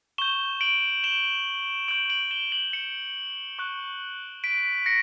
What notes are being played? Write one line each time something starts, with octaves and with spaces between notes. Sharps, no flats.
C#6 G6 E7 G7
D7 F#7
E7 G7
C#6 G6 D7 F#7
D7 F#7
E7 G7
D7 F#7
C#7 E7
C#6 F#6
B6 D7
A#6 C#7